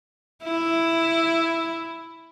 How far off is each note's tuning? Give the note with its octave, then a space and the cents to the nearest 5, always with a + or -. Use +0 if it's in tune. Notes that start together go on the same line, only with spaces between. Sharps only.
E4 +5